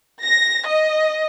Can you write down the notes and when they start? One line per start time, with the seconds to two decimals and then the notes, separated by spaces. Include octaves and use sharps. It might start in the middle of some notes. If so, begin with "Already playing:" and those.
0.23 A#6
0.67 D#5